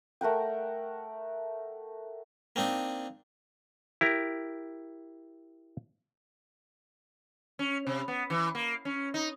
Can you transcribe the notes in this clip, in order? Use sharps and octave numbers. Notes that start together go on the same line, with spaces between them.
A3 A#4 F#5 G5
A#3 C4 D4 D#4
E4 G4 A#4
C#4
C3
B3
E3
A#3
C#4
D#4